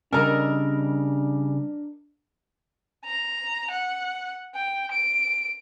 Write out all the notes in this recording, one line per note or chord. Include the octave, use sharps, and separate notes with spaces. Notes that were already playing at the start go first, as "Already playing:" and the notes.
C#3 G3 D4 A4 A#4 D#5 A#5
A#5
F#5
G5
D7